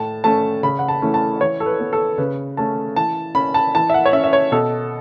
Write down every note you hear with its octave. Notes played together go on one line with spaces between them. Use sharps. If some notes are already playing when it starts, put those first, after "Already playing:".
Already playing: A2 A5
A3 C#4 A5
C#3 B5
F#5
A5
E3 A3 C#4
A5
E3 C#5
A4
B4
B3
A4
C#3 B4
A3 C#4 A5
E3 A5
C#4 B5
A5
E3 A5
E5
F#5
C#5
C#4 E5
E5
C#5
B2 A4